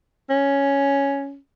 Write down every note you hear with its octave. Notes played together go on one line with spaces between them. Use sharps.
C#4